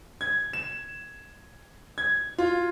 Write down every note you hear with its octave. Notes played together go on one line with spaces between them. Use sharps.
G#6
E7
G#6
F4